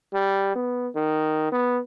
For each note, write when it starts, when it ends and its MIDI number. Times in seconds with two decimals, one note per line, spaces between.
0.13 0.55 55
0.55 0.88 59
0.95 1.50 51
1.52 1.79 59